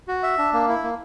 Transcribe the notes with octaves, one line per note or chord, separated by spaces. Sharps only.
F#4
E5
D4
A#3
E4
A#3